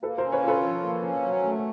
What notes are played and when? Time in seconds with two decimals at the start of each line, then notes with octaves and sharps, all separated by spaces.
0.03 A#3 A4 B4
0.18 C#4 A#4 C5
0.32 B4 C#5
0.42 F4
0.48 A4 B4
0.63 F3
0.83 A#3
1.02 C#4
1.22 F#3
1.43 A3